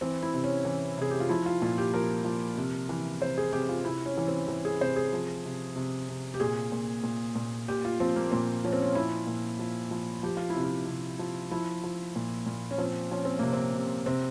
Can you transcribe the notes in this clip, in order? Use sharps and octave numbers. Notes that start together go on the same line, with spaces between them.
E3 C4
E4
C3
C#4
E3
C3 G#4
G4
F4
F3 E4
F4
A#2 F4
G4
F3 A#4
F3
C3
E3
C3 C5
G#4
C3 G4
F4
C3 E4
C#4
E3
C4
E3
G#4
C3 C5
G#4
F3
C3
C3
C3
G4
A#2 G#4
A#2
A#2
A#2
A#2 G4
F4
F3 C4
A#3
A#2 C4
F3 C#4
C4
C#4
F3 E4
A#2
F3
F3
F3 G4
F4
E4
C3
F4
C3
F3
F3 E4
F3
A#2
A#2
C#4
F3 C4
F3 C#4
C4
C3 A#3
C4
C3
C3 C4